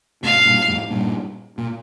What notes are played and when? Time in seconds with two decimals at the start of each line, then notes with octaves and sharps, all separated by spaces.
0.23 A2 C3 F5
0.45 G2 A#2
0.68 F2 A2
0.90 G2 A#2
1.58 A#2